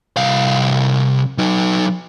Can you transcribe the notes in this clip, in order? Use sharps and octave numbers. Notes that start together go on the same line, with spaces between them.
C2 F5
F#3 D#4